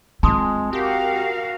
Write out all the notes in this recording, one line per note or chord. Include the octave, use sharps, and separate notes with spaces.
G#3 C4 F4 A5 C6 D#6
F#4 G4 A#4 F5